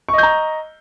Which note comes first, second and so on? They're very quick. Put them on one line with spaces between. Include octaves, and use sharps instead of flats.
C#6 D#5 G6 A#5